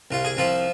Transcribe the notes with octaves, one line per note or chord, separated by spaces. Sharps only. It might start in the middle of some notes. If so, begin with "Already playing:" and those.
C2 F4
G#4
C2 F3 F4